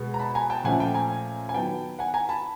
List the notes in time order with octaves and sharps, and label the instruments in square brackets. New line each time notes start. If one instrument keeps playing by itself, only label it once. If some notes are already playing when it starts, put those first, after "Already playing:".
Already playing: [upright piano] B2 G#3 B3
A#5
A5 B5
G#5 A#5
G5 A5
A#2 F3 A3 C#4 F#5 G#5
G5 A5
G#5 A#5
G#5
D#3 F#3 B3 G5 A5
F#5 G#5
G#5 A#5
A5 B5